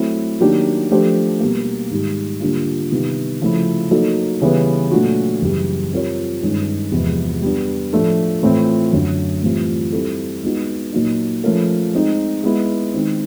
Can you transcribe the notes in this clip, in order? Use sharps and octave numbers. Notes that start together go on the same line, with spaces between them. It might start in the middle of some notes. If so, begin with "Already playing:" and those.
Already playing: F#3 A3 C4 E4
D#3 F#3 A#3 D4 G4
F3 A3 D4 G4 C5
B2 G3 A#3
G#2 D#3 G3
D3 G3 A#3 D4 F4
C3 D#3 G3 B3
C#3 F3 A3 C#4 E4
F#3 A#3 D#4 F#4 A4
C#3 E3 G3 B3
A#2 F#3 A3 D4 F#4
F#2 C#3 E3 G3
G3 C4 F4 A#4 C#5
G2 D#3 G#3 C#4
E2 C3 F3 G#3
G3 B3 D4
A2 F3 A3 D4
A2 E3 A3 C4 F4
F#2 D3 F#3
A2 E3 G3 C4 F4
G3 C4 E4 A4
G#3 B3 D#4 F#4
A#2 F#3 A#3 D#4
F3 A3 C#4 F4 A#4
G#3 C4 D#4
G#3 B3 E4
D#3 G#3 C4